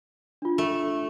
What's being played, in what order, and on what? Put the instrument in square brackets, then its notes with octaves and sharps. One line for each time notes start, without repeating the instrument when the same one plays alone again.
[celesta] D4 F4
[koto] A3